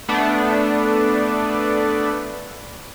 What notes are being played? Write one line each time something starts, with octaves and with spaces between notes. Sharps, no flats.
A3 B3 D4